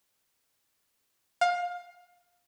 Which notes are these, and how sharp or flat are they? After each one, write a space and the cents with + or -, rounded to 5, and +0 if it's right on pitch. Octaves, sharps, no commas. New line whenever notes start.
F5 +20